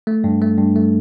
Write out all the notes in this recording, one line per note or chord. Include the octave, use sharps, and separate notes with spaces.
A3
G2
A3
G2
A3